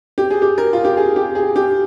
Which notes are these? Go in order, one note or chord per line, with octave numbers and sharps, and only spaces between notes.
G4
G#4
G4
A#4
F4
G4
G#4
G4
G#4
G4